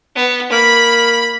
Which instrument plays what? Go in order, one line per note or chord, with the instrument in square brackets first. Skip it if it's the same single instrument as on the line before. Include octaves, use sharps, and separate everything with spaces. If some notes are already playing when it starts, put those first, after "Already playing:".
[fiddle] B3
[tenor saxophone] A#3 [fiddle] B5